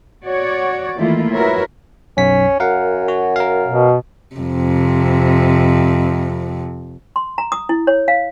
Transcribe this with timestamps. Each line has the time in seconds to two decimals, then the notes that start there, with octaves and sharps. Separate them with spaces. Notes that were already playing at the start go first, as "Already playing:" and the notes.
0.23 F#4 C#5 D5
0.98 D#3 E3 A3 A#3 E4 F4
1.33 E4 F#4 A#4 B4 C#5 E5
2.17 B1 F#2 C#4 B6
2.60 F#2 A#4 F5 F#5
3.08 F#4
3.36 A#4 F5
3.67 B2
4.35 F2 C3
7.16 C6
7.38 A#5
7.52 D#6
7.69 E4
7.87 C#5
8.08 F5